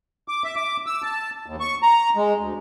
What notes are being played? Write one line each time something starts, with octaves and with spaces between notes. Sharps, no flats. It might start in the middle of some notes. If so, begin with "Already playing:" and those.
D6
E5
D6
E6
A5
D#2
C#6
A#5
G#3
D2